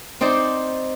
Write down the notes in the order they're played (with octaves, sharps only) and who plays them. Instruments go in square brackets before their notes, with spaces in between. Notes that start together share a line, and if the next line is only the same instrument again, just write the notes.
[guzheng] C4 D#4 C5 D5